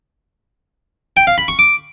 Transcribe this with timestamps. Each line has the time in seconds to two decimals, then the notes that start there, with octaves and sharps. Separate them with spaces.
1.17 G5
1.27 F5
1.38 B5
1.48 C#6
1.59 D6